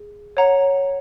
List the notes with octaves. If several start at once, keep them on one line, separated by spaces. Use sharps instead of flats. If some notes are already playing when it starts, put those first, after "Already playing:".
Already playing: G#4
C#5 F#5 A#5